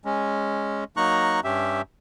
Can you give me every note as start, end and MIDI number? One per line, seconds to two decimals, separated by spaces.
0.05 0.84 56
0.05 0.84 61
0.97 1.40 54
0.97 1.40 58
0.97 1.40 63
0.97 1.40 82
0.97 1.40 85
0.97 1.40 90
1.44 1.82 43
1.44 1.82 61
1.44 1.82 67
1.44 1.82 76